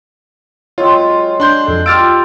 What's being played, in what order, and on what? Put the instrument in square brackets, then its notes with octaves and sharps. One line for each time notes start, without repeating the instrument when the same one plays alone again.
[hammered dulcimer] F#3 G#3 C4 [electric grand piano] F4 [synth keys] C#5
[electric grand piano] D4 C6 G6
[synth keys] F2 A4
[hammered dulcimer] F4 G4 D5 [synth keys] D6 E6 [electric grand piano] F6 A6 D7